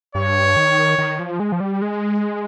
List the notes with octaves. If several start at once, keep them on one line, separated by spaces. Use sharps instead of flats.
G2 C#5
D#3
D#3
F3
G#3
F3
G3
G#3